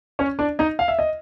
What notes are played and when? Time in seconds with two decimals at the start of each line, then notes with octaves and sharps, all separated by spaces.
0.19 C#4 C#5
0.39 D4 D5
0.59 D#4 D#5
0.79 F5
0.88 E5
0.99 D#5